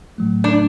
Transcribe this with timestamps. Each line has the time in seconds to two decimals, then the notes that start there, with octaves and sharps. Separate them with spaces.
0.18 A2 F#3 A3
0.44 D4